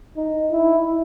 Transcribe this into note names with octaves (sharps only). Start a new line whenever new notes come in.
D#4
E4